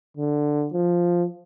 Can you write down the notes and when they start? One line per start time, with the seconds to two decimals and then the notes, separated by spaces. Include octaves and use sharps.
0.17 D3
0.73 F3